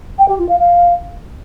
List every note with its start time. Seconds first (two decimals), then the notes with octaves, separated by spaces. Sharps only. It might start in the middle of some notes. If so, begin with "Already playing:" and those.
0.18 G5
0.28 G4
0.39 F4
0.49 F5
0.59 F5